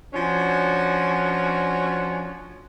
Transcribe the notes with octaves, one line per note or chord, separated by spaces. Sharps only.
F3 C#4 D4 F#4 G#5